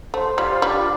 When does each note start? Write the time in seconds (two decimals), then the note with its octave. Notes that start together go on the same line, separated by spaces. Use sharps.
0.13 A3 C5
0.38 G3 F4
0.62 G3 D4